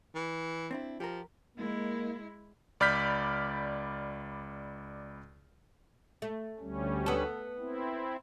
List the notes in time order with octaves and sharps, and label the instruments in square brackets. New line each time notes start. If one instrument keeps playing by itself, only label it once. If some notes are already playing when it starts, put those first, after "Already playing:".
[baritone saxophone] E3
[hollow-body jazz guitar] C4 D4 E4
[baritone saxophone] F3 [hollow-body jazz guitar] G4 A#4
[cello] G#3 E4 [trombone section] A#3
[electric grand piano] C#2 D5 B5 F6 G6 B6
[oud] A3
[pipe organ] D2 G3 C#4
[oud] B3 A4
[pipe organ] C4 E4